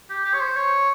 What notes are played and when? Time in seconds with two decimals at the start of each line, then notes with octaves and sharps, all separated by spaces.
0.10 G4
0.25 G4
0.34 C#5
0.41 C5
0.57 C#5